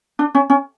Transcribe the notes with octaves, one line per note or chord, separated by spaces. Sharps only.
D4
C#4
C#4